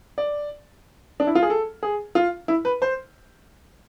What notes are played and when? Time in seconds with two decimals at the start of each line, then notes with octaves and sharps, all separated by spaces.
0.18 D5
1.20 D4
1.27 E4
1.35 F4
1.42 G#4
1.50 A4
1.83 G#4
2.15 F4
2.48 E4
2.65 B4
2.82 C5